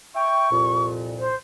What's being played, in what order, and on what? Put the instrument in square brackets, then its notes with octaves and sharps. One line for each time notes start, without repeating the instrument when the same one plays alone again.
[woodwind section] E5 G5 [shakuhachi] C#6
[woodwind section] C2 F2 A#2
[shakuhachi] C5